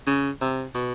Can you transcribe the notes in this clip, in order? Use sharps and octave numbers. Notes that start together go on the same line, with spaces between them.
C#3
C3
B2